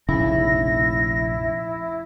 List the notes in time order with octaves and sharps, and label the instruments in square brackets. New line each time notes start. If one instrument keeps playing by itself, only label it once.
[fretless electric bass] F1 A#1 C#3 [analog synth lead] E4 [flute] A#6